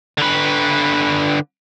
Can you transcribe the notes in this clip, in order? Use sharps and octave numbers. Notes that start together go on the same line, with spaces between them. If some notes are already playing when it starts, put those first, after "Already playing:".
D3 B4